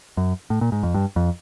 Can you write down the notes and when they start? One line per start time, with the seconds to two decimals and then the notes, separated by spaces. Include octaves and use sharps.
0.17 F#2
0.50 A2
0.61 A#2
0.72 G#2
0.83 F2
0.94 G2
1.16 F2